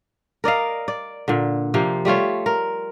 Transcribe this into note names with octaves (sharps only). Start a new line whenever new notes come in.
A#4 D5 D#5 F5
D5
A#2 D3
C3 F3 A#3
G3 A3 F4 C#5
A#4